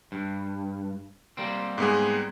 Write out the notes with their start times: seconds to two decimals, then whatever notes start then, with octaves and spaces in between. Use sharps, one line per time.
0.12 G2
1.37 G3 A#3 C4
1.78 G#2 B3 G#4